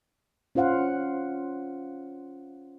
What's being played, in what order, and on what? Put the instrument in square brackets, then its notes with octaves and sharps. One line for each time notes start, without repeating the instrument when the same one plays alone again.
[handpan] C#4 F4 C5 F5 F#5